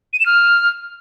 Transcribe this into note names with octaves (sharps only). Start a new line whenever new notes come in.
D#7
E7
F6